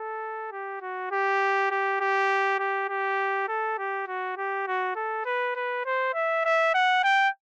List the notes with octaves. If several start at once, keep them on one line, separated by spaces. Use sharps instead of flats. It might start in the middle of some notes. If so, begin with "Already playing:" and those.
Already playing: A4
G4
F#4
G4
G4
G4
G4
G4
A4
G4
F#4
G4
F#4
A4
B4
B4
C5
E5
E5
F#5
G5